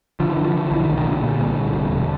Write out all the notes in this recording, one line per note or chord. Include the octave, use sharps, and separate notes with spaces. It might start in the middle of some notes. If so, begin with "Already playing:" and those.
D3 F3
E3
D3
F3
D3
F3
B1 E3
D#3
B1
D#3
A#2 D3
A#2
C2
C2
E1
E1